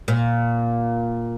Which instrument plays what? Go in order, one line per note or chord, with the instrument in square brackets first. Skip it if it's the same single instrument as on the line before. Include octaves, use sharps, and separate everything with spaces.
[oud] A#2